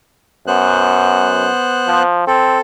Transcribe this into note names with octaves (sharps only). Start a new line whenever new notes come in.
F#2 B3 C5 F#6
F3
C4 A4